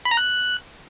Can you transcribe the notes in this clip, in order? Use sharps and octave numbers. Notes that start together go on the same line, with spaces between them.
B5
A#5
F#6